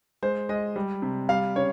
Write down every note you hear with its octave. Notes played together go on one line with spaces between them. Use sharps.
G#3 C5
G#3 D#5
G3
C3
G3 F5
C#3 C#5